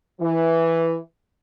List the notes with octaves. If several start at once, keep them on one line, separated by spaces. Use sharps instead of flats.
E3